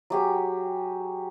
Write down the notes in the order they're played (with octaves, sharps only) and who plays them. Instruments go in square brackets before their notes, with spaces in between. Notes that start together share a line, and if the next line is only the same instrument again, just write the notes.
[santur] F#3 G4 G#4